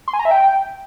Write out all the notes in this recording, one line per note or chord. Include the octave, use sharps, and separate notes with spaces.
C6
G#5
A#5
E5
G5